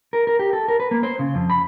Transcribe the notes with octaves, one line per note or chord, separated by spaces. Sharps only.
A#4
A#4
G4
A4
A#4
B4
A#3
C5
C#3
F2
B5